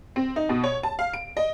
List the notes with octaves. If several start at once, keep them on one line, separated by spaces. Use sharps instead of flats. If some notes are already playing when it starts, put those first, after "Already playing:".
C4
D#4
B2
C#5
A5
F5
D7
D#5